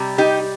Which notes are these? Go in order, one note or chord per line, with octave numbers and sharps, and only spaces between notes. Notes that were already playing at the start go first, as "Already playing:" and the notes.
Already playing: C3 G3
D#4 G4